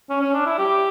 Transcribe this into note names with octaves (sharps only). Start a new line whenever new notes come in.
C#4
C#4
D4
E4
G4